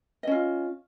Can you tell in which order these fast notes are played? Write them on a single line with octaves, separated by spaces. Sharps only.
D#5 C#4 F4